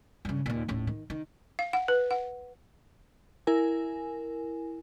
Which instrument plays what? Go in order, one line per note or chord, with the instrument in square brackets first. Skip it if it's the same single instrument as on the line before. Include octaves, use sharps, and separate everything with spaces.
[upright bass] G2 C#3
D#2 A#2
D#1 A2
D#3
D#3
[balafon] F5
F#5
B4
F#5
[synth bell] E4 A#4 G#5